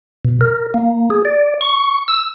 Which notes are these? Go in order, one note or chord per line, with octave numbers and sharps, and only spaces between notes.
B2
A#4
A#3
G#4
D5
C#6
E6